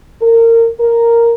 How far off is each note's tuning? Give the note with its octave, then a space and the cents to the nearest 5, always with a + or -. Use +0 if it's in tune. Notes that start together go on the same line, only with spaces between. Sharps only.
A#4 -25
A#4 -5